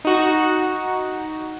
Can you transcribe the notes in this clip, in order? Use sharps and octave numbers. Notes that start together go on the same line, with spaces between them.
D#4 F#4